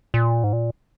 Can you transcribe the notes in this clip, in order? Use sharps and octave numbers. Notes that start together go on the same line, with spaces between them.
A#2
G#2
A#2